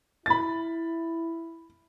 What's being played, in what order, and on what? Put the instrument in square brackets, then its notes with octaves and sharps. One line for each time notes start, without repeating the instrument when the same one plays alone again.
[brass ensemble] E4 [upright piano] B5 A6